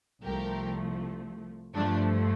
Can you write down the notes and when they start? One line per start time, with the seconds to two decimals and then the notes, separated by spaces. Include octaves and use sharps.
0.23 C2 C3 F3 A3 G4 A#4
1.73 G2 F3 A3 D4